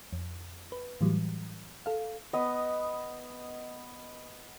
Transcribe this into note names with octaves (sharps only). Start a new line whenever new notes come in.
F2
B4
A2 E3 F#3 G3
A4 F5
B3 D#5